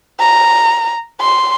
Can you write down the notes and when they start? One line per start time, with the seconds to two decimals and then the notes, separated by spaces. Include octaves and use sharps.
0.20 A#5
1.21 C6